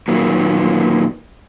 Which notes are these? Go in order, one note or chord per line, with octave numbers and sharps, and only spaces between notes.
A#2 D#3 F#3 A#3 B3